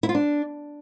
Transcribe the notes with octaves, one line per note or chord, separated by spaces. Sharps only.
E4
F4
D4